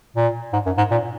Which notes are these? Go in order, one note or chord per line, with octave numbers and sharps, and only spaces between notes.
A#2
G#2
F#2
G#2
A#2